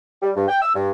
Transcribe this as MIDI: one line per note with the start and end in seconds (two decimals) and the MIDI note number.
0.22 0.31 55
0.36 0.45 43
0.48 0.59 79
0.62 0.75 88
0.75 0.91 43